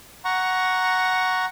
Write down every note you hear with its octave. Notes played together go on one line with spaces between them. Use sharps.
F#5 A#5 C#6